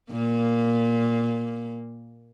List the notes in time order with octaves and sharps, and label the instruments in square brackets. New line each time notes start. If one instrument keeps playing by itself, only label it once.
[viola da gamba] A#2 A#3